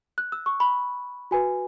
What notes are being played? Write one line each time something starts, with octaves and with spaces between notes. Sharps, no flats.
F#6
E6
C#6
B5
F#4 B4 G#5